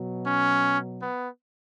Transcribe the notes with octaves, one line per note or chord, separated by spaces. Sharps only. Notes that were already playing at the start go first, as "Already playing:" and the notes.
Already playing: B2 F#3
C#4
B3